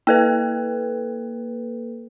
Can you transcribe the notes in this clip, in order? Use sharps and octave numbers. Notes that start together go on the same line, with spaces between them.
A#3 A4 B4